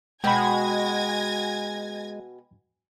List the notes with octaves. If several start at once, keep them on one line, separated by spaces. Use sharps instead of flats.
B2 G#3 F#4 G5 G#5 B5 G#6 A#6